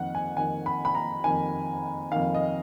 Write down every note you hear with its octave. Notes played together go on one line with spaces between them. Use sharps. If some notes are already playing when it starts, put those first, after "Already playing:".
Already playing: F2 D#3 F#5
G#5
F2 D#3 G#5
B5
B5
A#5
F2 D#3 G#5
F2 D#3 F5
D#5